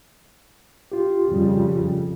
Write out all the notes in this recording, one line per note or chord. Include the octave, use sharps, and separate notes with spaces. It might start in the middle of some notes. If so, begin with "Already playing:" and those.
F4 G4
F2 C#3 G3